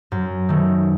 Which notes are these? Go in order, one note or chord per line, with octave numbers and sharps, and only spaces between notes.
F#2
D#3 A3